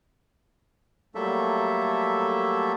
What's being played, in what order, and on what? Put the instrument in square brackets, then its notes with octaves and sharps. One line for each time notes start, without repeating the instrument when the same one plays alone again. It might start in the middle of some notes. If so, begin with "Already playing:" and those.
[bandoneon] F#3 G3 A3 A#3 A4 E5